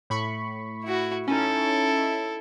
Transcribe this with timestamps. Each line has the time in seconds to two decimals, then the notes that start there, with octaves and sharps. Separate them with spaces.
0.10 A2 B5 C#6
0.84 E4 F#4
1.28 C#4 D#4 E4 A4